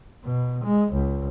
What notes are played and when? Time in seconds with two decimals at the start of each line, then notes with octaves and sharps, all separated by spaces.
0.24 B2
0.64 G#3
0.93 C#2